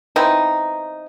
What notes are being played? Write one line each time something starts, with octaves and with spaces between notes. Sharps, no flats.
E3 B3 C4 D#4